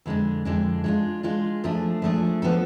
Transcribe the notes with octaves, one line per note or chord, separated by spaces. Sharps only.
F2 D3 G#3 D4
F2 D3 G#3 D4
G#3 D4 F4
G#3 D4 F4
F3 A3 D4 G#4
F3 A3 D4 G#4
F3 B3 D4 A4